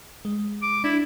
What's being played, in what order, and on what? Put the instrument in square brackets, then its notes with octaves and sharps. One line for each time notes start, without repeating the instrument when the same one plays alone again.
[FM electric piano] G#3
[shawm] D6
[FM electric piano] D4 [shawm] E4